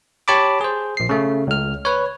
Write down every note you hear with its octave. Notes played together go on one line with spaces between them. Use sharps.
G4 C#5 A5 B5 D6
G#4 C5
A#1 C7
C#3 A3
C#2 F6
B4 C#5